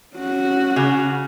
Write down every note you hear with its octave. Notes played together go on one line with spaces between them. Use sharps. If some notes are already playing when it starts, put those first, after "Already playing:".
C#4 F#4
C#3